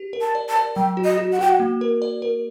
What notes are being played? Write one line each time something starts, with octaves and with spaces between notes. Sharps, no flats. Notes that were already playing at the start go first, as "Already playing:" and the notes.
Already playing: G4
A#4
A5
D5
A5
D5
F#3 G5
F#4
D#5
F#4
F#5
F#4 G5
F#5
A#3
A#4
D5
A#4